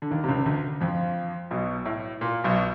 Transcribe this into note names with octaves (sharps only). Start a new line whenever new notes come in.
D3
D#2 D#3
C3
C#2 C#3
D2 D3
F2 F3
B1 B2
A2
A#2
B1 B2